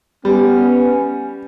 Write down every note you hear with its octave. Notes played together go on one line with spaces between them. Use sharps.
G3 B3 C#4